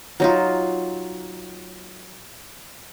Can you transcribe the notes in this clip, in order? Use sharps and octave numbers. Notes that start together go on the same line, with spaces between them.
F#3 D#4 F4